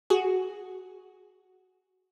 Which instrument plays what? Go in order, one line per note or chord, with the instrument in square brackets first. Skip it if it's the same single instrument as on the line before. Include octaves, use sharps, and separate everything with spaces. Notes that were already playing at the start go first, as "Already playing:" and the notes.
[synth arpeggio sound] F#4 G#4